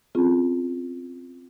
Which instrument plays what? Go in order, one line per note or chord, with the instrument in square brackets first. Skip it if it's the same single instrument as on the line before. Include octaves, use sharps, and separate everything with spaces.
[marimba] C4 C#4 F4 G#4